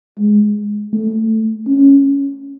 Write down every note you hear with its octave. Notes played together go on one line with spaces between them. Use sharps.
G#3
A3
C#4